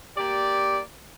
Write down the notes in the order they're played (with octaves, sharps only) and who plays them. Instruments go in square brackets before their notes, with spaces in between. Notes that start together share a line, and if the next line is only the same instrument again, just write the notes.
[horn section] A#3 G4 D5